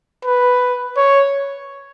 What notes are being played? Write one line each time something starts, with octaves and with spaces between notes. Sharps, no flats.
B4
C#5